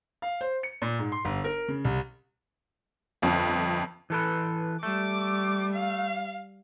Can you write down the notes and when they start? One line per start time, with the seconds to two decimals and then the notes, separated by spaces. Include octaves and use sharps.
0.22 F5
0.41 C5
0.63 C#7
0.82 A#2
0.99 G#2
1.12 C6
1.25 G1
1.44 A#4
1.68 C#3
1.85 C2
3.22 G1 F2
4.10 E3 A4 B4
4.83 G3 A3 D6
5.74 F5